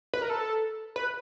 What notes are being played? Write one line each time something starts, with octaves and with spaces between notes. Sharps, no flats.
B4
A#4
A4
B4